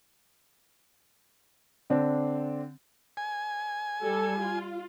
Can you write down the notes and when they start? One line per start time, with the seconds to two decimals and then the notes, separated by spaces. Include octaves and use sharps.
1.90 D3 C4 D4
3.17 G#5
4.03 G3 A4
4.40 F4